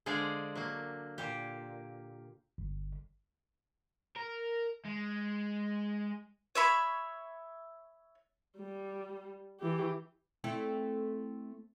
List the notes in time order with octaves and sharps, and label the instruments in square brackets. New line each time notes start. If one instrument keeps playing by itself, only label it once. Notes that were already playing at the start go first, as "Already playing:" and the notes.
[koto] D3 G#3 G#4 C5 D5 F5
F#3 A#3
A#2 G4
[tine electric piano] G1
[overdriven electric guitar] A#4
G#3
[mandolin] C#5 E5 B5
[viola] G3
E3 G4
[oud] A3 C4 E4